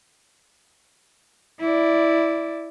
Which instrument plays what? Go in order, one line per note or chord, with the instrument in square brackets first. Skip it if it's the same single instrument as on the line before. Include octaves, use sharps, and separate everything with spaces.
[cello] E4 D5